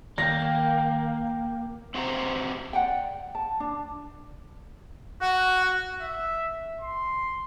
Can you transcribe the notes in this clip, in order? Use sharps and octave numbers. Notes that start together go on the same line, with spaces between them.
D#3 A#3 A#4 G5 A#6
C4 F#4 G4 C5 F5 A#5
D5 F#5 G5
A5
D4
F#4 F#5
E5
C6